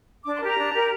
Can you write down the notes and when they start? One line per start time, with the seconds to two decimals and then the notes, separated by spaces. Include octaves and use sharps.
0.24 D4 D6
0.35 C6
0.41 G4 A#4 A#5
0.57 D4
0.73 G4 A#4